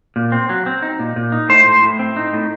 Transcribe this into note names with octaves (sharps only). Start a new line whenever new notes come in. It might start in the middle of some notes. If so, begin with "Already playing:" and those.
A#2
C4
F#3
C4
D#4
A#2
A#2
D#4
A2 C5
A2
A2
C4
D#4
A2